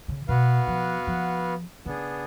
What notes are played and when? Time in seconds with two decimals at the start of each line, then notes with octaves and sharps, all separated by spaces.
0.08 C#3
0.28 B2 B3 F#4 B4 F5
0.67 F3
1.07 F3
1.86 C#3 B3 D4 G#4